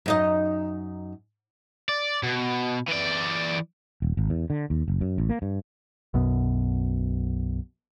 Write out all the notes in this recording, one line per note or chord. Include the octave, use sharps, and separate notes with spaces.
F#2 D#4 D#5
D5
B2
E3 D5
D#1
G#1
E2
D3
D#2
F#1
F#2
A1
A#3
G2
B1 F#2 B2